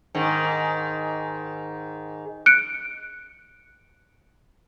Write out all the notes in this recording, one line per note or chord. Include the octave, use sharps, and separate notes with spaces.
G#2 D#3
F#6 C#7 D7